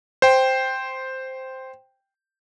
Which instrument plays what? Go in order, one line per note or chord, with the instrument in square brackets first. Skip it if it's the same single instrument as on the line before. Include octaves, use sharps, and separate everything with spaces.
[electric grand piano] C5 G5